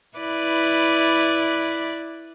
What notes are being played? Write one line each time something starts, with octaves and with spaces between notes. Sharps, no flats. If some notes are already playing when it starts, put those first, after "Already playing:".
E4 B4 D5